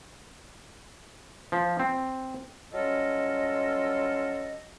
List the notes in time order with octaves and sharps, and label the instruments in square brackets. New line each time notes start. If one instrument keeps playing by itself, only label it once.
[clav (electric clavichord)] F3
C4
[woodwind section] F#3 G3 C#4 F4 A4 D#5